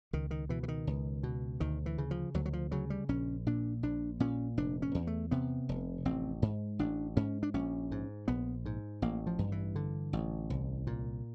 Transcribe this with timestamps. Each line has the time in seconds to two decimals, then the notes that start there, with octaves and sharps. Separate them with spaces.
0.13 C#2 D#3
0.31 D#3
0.49 B2 E3
0.63 E3
0.68 D#3
0.87 C#2
1.23 B2
1.60 D2 D#3
1.86 E3
1.98 C#3
2.11 F3
2.34 D2 F#3
2.46 F#3
2.53 F3
2.72 C#3 F#3
2.90 G3
3.09 A#1 C#4
3.46 A#2 D4
3.83 A#1 D4
4.20 A#2 C#4
4.57 F1 D4
4.82 C#4
4.95 E2
5.07 A3
5.31 C3 B3
5.69 F1
6.05 A1 C4
6.42 G#2
6.79 A1 D4
7.17 G#2 C#4
7.43 D4
7.54 A#1 C#4
7.91 G#2
8.28 A#1 B3
8.66 G#2
9.02 A1 A#3
9.27 F3
9.39 G2
9.52 E3
9.76 D3
10.13 A1
10.50 C2
10.87 A#2